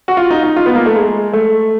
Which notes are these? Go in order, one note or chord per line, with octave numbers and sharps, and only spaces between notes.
F#4
F4
D#4
D#4
F4
B3
A#3
A3
G#3
A3